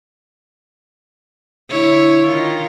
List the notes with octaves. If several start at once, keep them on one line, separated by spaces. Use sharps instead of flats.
D3 E4 C#5
D#3 F4